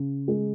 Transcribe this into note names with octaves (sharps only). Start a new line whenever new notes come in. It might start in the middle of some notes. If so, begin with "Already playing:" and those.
Already playing: C#3
G#3